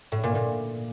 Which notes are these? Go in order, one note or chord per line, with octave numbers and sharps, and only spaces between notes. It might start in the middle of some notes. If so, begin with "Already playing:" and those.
A2
A#2
A#2